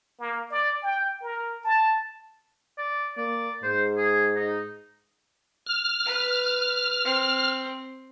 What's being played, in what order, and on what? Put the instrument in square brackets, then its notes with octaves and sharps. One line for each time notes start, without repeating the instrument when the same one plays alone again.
[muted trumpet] A#3
D5
G5
A#4
A5
[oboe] D5
[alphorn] A#3 [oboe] D5
[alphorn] G#2 [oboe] C5
[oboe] G#4
D#4
[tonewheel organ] F6
[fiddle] B4
C4